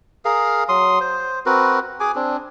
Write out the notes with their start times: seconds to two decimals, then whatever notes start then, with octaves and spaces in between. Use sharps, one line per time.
0.25 G#4 A#4 F5
0.69 F#3 C6 D#6
1.01 C5
1.46 C4 F#4 A#4 B4
2.00 G#4 G#5 D6
2.15 C4 D4